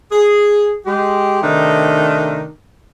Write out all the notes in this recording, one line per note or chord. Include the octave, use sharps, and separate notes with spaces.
G#4
G#3 G4
C3 D#3 A3 D4 D#4